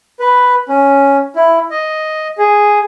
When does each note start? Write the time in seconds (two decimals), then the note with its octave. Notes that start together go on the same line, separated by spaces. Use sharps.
0.20 B4
0.69 C#4
1.36 E4
1.71 D#5
2.38 G#4